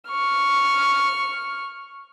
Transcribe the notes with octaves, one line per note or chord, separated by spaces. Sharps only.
C#6 F6